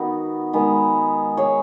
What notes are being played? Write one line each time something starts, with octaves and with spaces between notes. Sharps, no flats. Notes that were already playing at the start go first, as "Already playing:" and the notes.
Already playing: D#3 B3 D#4 F#4
D#3 G#3 B3
G#4 C#5